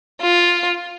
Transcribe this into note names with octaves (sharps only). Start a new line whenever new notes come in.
F4